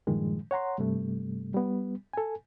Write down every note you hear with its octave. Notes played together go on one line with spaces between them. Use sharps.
G2 A#2 D#3 F3 G#3
C#5 F#5 A#5 C6
G2 C3 G3 A3
G3 B3
A4 G#5